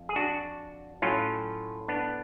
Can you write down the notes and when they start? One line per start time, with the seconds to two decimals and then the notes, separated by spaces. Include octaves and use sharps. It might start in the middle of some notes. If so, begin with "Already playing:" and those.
Already playing: F2
0.09 G#4
0.16 D4 F#4
1.02 A2 F#3 C#4 F4
1.88 B3 D4